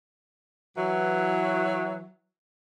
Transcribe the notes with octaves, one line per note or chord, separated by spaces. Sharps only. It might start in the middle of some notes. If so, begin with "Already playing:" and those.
E3 F#3